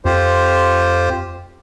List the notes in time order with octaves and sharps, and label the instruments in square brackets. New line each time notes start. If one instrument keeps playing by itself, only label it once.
[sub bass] F2 [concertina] F4 G4 C5